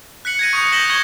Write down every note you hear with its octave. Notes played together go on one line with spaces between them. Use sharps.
F#6 B6 C#7 F#7
G#6 A#6 D#7
C#6 D#6 G6 G#6 A#6 C#7
G6 A#6 B6 E7 F#7 G7
C#6 G6 G#6 B6 G7